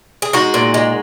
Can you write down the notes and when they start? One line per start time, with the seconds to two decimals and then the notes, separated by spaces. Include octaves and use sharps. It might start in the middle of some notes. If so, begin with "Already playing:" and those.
0.22 G#4
0.33 G#3 D#4 F#4
0.54 A#2
0.74 G#3